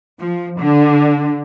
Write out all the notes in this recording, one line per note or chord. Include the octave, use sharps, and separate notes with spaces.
F3
D3